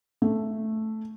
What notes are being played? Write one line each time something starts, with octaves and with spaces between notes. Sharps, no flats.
A3